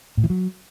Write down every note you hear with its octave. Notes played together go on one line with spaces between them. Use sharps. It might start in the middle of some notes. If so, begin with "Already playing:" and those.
A2
E3
F#3